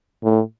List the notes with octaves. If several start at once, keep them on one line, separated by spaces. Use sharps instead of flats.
A2